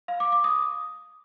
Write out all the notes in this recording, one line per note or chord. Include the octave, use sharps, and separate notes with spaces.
F5
D6
D6
D#6